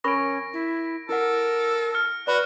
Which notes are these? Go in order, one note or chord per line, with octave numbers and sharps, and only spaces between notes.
C#4 A#4 B5 C#6 A#6 D7
E4
E4 A4 A#4 F#5
F6 C#7
F#4 B4 D5 B5